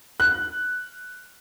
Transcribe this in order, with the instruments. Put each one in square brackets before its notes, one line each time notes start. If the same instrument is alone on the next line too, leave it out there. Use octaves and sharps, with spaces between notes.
[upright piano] F#6